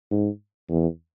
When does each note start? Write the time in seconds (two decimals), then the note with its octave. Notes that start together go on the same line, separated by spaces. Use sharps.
0.11 G#2
0.69 E2